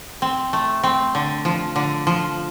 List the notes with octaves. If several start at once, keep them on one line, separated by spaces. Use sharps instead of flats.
C4
A3
C4
D3
F3
D3
F3